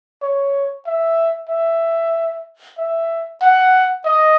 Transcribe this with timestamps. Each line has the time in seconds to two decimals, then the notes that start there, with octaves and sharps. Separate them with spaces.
0.22 C#5
0.86 E5
1.49 E5
2.78 E5
3.42 F#5
4.06 D#5